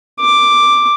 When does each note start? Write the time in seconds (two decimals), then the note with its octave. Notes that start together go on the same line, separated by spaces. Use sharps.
0.21 D6